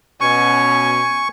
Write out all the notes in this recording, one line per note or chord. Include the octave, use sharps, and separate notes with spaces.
B2 C#4 G#5 C#6